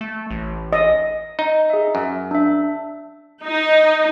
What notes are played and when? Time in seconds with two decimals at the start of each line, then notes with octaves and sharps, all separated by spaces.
0.01 A3
0.30 A1
0.73 D#5
1.39 D#4
1.70 G#4 E5
1.95 F#2
2.31 D4 E5
3.44 D#4